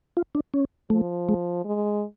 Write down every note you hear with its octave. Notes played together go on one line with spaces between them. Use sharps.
F4
D4
C#4
F3 A3
G#3
G#3